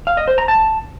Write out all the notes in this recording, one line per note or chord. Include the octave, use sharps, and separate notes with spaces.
F5
D#5
C5
A#5
A5